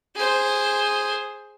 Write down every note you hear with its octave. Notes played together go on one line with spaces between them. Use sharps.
G#4 C5